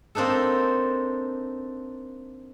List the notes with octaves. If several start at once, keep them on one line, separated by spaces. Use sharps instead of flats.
A#3 C4 D4 D#4 A4